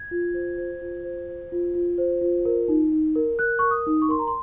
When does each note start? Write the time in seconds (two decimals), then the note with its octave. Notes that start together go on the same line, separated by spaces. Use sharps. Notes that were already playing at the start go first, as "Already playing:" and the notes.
Already playing: G#6
0.11 F4
0.34 C5
0.57 C5
0.82 F4
1.04 C5
1.28 C5
1.52 F4
1.75 F4
1.98 C5
2.21 F4
2.45 A#4
2.68 D#4
2.92 D#4
3.16 A#4
3.39 A#4 F#6
3.59 A#4 C#6
3.71 D#6
3.86 D#4
4.02 C#6
4.09 A#4 C6
4.19 A#5
4.28 C6